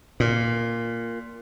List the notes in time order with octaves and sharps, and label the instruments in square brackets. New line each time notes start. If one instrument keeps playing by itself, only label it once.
[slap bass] A#2